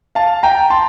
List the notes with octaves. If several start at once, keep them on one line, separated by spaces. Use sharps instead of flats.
F5 A5
G5 A#5
A5 C6